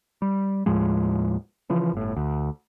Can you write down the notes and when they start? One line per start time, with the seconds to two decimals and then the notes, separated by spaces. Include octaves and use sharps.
0.22 G3
0.66 D#2 A2 F3 G#3
1.70 C#3 E3 F3
1.93 G1 A2
2.16 D2